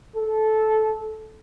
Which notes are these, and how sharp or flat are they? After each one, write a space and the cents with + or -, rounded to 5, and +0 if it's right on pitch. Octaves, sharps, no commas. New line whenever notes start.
A4 -15